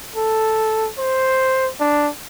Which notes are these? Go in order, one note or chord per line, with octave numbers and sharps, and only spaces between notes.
A4
C5
D4